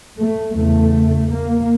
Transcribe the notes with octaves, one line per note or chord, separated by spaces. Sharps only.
A3
E2 C#3 A3
A#3